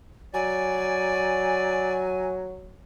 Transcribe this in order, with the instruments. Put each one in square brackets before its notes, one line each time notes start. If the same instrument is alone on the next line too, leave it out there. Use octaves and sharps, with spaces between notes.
[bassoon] F#3 [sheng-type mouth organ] D5 [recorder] G#5